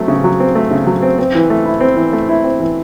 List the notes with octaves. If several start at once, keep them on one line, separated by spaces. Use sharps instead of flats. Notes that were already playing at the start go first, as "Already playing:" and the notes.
Already playing: F#3 A3 C4
C#3
F#3
C4
A3
C#3
F#3
C4
C4
E3
A3
E4
C4
E3
A3
E4
C4
E3